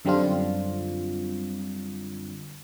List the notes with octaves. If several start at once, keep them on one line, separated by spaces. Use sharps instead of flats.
F#2 D3 G3 C4 D4 F4